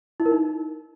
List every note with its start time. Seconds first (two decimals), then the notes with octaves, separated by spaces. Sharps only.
0.20 E4
0.26 A#4
0.32 D#4